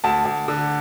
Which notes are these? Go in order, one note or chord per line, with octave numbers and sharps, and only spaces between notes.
D2 A5
D2
D3